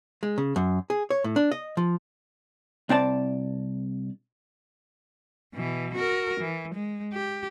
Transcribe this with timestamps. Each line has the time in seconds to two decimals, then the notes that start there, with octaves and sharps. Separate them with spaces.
0.23 G#3
0.38 C#3
0.56 F#2
0.90 G#4
1.10 C#5
1.24 A2
1.36 D4
1.52 D#5
1.77 F3
2.89 C2 C4 D5 A5
5.54 B2 E3
5.94 F#4 A#4
6.40 E3
6.75 G#3
7.13 G4